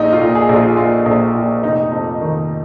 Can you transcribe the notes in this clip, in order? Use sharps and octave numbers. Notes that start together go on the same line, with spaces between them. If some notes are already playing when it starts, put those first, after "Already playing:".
Already playing: A#1 D#4
F4
A#2
G#4
A#1
F4
G#4
A#2 F4
A#1
A#2
F1 D#4
F2
D#3